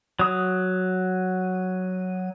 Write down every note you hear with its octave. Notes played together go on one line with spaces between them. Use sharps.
F#3 D#6